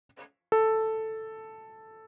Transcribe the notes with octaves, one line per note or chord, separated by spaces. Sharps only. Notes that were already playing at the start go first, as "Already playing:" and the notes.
A4